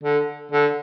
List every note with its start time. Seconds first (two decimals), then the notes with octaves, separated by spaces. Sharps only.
0.04 D3
0.52 D3